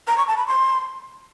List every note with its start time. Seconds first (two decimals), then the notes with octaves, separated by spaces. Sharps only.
0.08 A#5
0.17 C#6
0.27 A5
0.37 B5
0.47 C6